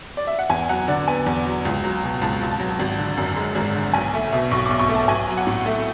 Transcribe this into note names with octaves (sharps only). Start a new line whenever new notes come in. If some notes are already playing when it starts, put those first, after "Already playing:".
D5
E5
F#5
E2 G#5
F#3 F#5
D3 D5
B3 G#5
E2
F#3
C#2
F#3
B2
C#2 A5
C#2
A5
F#3
G#1
D3
F#2
G#3
G#1
D3
B1 G#5
A3
B2 E5
B1 C#6
B1 D6
C#6
A3
A5
B1 G#5
F#3
F#5
A2
A3